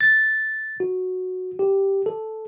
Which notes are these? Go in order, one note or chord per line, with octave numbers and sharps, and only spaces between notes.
A6
F#4
G4
A4